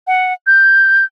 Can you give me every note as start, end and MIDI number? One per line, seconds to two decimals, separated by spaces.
0.07 0.33 78
0.47 1.05 91